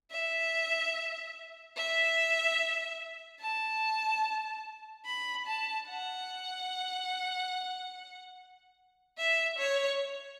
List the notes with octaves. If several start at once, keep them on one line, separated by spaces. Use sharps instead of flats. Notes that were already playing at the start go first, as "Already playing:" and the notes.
E5
E5
A5
B5
A5
F#5
E5
C#5